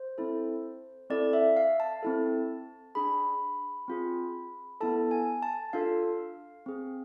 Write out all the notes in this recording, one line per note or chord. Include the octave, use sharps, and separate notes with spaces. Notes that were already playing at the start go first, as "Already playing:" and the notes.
Already playing: C5
C4 E4 A4
C4 E4 A4 D5
E5
F5
A5
C4 E4 A4
D4 G#4 B5
C4 F4 G#4
B3 E4 A4 A5
G#5
A5
D4 F4 A4 F5
C4 G#4